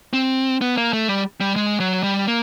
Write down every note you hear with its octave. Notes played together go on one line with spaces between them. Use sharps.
C4
B3
A#3
A3
G3
G3
G#3
F#3
G3
A#3